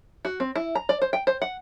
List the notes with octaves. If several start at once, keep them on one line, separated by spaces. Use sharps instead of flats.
F#4
C4
E4
A#5
D5
C5
G5
C5
F#5